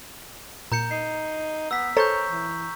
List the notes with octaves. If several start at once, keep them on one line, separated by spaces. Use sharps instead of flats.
A#2 A#5 G6 C#7
D#4 C7
B3 E6 B6
A4 A#4 C5 C#5 A#5 C#6 G6
E3